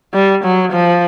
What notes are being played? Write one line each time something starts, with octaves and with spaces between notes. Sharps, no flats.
G3
F#3
F3